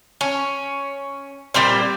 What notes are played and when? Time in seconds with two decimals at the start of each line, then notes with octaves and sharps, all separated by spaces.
0.21 C#4
1.54 A#2 G3 C4 C5